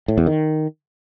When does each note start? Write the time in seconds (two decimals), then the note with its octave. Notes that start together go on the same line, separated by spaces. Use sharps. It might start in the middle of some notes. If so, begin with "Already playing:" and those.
0.08 A2
0.18 E2
0.27 D#3